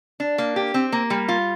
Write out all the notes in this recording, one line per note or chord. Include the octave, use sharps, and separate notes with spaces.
D4
A#3
G4
C4
A#3
G3
F4